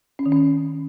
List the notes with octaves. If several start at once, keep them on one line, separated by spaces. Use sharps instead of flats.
C#4
D#3
C#4